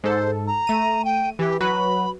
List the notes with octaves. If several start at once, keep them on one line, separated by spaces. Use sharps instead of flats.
G#2 A4 C5
A#5
A3 D#7
G5
E3 G4
F#3 F#4 B4 B5